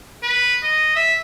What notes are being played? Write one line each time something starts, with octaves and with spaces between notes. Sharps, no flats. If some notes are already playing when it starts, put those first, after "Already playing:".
B4
D#5
E5